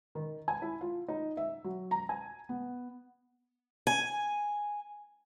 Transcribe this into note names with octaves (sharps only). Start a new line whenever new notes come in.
D#3
G#5
E4
F4
D#4
E5
F#3
A#5
G#5
B3
G#5